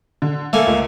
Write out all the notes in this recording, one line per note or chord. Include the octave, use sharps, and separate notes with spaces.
D3
A3 A#3 A4 G#5
C#2